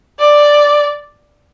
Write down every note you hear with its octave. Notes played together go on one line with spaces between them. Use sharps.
D5